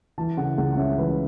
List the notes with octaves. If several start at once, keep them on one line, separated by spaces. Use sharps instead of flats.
E3 A5
C#3 F#5
C#2 F#5
F#5
C#4 E5
E3 B4